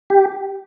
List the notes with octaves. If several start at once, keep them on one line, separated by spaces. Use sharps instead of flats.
G4